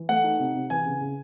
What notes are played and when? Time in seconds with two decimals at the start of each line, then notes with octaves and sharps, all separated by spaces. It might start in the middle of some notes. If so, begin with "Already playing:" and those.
Already playing: E3
0.09 A3 F#5
0.24 D#4
0.39 C3
0.55 C3
0.70 E3 G#5
0.86 C#3
1.01 C#3